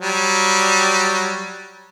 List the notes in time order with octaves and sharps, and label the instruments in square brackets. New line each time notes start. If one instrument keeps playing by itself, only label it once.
[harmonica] F#3 G3